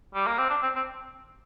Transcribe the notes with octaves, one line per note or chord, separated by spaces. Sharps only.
G3
A#3
C4
D4
C4
C4